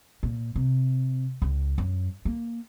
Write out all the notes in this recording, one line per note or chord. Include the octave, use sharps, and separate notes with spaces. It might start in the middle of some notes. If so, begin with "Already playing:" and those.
A#2
C3
C#2
F#2
A#3